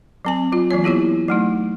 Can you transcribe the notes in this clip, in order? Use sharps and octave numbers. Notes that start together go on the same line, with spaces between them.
F#3 C4 G#5
F#3 F4
E3 F#3 A#3 C#5
B3 E4 G4 C#5
F#3 A3 D#4